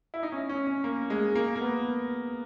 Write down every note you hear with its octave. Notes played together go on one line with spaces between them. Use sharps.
E4
D#4
C#4
C#4
C#4
A#3
G#3
A#3
A#3
B3